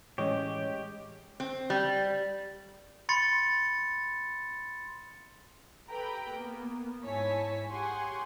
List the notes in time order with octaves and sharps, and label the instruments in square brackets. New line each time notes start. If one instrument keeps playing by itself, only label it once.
[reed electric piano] A2 E3 [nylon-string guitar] G#3 C#4 D#5 [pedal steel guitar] G4 [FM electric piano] C#5
[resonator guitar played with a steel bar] C4
G3
[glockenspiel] B5 C6 A6 C#7
[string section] G4 A4 B4 G5 A#5 B5
A#3 B3
G#2 E4 C#5 G#5 A5 B6
G4 G#4 F#5 G#5 C6 C#6